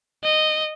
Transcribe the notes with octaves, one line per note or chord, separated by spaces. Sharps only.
D#5